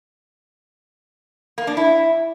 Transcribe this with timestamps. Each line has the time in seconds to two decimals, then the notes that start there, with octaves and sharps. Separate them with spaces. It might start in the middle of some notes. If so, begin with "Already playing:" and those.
1.58 A#3
1.67 D4
1.77 E4